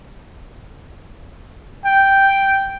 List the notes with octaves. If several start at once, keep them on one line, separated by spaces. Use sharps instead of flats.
G5